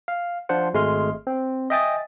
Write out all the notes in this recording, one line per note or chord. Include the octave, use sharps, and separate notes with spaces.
F5
F3 D4 F4 C5 F#5
G#1 G#3 A3 C6 F6
C4
D#5 E5 G5 G#5 D#6 A6